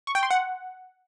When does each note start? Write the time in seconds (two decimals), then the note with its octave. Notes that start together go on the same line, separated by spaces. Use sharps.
0.07 C#6
0.15 G5
0.23 C6
0.31 F#5